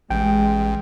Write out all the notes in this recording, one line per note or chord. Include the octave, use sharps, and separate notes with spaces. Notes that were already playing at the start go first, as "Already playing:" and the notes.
A1 G#3 G5